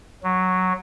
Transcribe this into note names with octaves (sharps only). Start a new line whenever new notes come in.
F#3